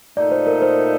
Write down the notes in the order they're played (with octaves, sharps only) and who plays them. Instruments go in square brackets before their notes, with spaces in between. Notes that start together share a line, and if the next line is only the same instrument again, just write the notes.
[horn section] A#2 A3 D#4 [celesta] D5
[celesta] C5
A#4
C5